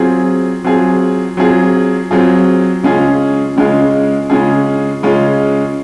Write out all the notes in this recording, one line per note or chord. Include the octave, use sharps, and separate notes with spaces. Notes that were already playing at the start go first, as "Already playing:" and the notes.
Already playing: F#3 C4 F4 G#4
F#3 C4 F4 G#4
F#3 C4 F4 G#4
F#3 C4 F4 G#4
C#3 G#3 C#4 F4 G#4
C#3 G#3 C#4 F4 G#4
C#3 G#3 C#4 F4 G#4
C#3 G#3 C#4 F4 G#4